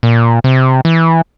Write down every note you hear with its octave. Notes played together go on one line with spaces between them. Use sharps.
A#2
C3
E3